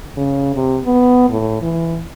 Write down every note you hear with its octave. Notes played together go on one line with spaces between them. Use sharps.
C#3
C3
B3
A2
E3